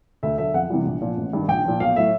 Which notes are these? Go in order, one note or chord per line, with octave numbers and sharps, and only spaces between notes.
D2 E5
D3 F#3 E5
F2 F#5
C3 E3 G3
A#1
A#2 F3
A1
G2 D#3
A#1 G5
A#2 F3
B1 F5
A2 F#3 E5